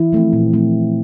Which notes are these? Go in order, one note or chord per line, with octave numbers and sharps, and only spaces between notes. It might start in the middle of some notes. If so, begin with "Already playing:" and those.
Already playing: E3 E4
F3 A3 C4
A#2
F3 A3 C4